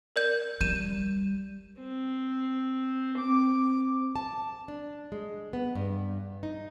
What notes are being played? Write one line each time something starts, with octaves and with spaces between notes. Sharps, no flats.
A#4 D5 G6
G3 G6 D#7 E7
C4
C4 D6
A5
D4
G#3
B3
G2
D#4